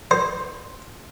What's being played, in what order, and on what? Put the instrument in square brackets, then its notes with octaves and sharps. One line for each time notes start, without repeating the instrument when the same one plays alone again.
[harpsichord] C5